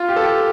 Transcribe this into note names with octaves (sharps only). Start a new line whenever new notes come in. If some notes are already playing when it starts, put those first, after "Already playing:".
Already playing: F4
G4
A4
G4